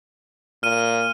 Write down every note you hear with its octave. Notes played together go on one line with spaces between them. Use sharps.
A#2 F6 D#7